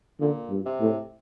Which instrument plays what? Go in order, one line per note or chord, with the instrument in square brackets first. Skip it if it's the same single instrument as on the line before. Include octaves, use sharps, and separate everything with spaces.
[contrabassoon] A#2 [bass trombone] D3
[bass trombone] G2
[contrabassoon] C3
[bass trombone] A2